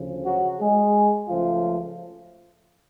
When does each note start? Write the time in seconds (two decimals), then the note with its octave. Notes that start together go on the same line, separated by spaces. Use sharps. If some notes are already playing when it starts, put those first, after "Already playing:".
Already playing: D2 C#3 F3
0.25 F#3 F#4
0.60 G#3 G#4
1.29 C#2 C#3 F3 F#3 A3 F4